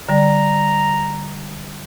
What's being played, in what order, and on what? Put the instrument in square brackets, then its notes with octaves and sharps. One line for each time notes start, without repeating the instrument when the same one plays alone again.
[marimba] D3 G3 D5 [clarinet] A#5